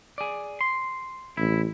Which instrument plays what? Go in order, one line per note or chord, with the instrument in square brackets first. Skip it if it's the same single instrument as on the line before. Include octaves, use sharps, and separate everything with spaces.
[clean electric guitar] G#4 D5
C6
[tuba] A1 [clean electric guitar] E4